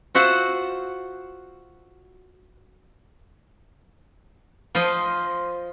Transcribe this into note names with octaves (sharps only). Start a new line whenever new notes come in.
F4 F#4 C5 E5 F#5
F3 F4 C5 D#5